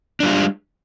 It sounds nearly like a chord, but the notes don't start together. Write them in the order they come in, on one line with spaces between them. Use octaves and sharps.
D4 G3 F4 G#3